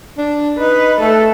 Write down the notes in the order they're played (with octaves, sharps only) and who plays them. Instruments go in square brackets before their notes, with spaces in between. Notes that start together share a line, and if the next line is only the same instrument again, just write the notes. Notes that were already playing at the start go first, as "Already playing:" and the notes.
[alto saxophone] D4
[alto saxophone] D#4 [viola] B4
[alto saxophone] A3 [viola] A4